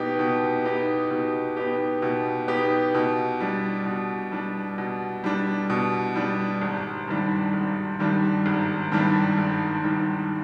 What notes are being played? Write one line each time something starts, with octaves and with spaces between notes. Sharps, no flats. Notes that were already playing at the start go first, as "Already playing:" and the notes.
Already playing: B2 B3 D#4 G4
B2
B3 D#4 G4
B2
B3 D#4 G4
B2
B3 D#4 G4
B2
G3 D4
B2
G3 D4
B2
G3 D4
B2
G3 D4
G#1
G2 D#3 G3 D4
G#1
G2 D#3 G3 D4
G#1
G2 D#3 G3 D4
G#1
G2 D#3 G3 D4